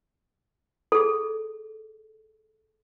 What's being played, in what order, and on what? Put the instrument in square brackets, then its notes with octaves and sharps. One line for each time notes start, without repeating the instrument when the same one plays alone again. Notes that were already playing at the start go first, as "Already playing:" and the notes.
[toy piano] G#4 A4